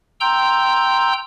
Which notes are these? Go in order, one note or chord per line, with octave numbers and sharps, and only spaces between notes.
G5 A#5 C6 E6 G6